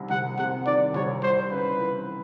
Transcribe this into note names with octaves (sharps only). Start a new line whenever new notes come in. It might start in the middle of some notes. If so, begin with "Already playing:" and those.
Already playing: C2 C3 D#3
C2 F#5
C3 F#5
D#3 D5
C2 C#5
G3 C5
C#3 B4
E3